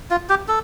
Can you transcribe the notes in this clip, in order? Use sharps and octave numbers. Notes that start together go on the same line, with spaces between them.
F4
G4
A4